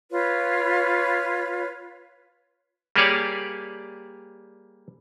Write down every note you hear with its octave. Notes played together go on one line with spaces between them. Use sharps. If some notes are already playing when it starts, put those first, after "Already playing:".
F4 B4 C#5
G3 A#3 G4 G#4 C#5 D5